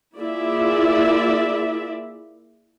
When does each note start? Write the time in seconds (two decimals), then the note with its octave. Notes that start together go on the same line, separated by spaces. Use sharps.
0.18 A#3 E4 F4 G#4 D5 E5